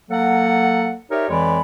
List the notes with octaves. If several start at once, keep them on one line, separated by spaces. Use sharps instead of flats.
F#3 A#3 A4 F#5
D#4 G4 A#4 C#5 D5 E5
F2 E3 G#3 C#5 D5 B5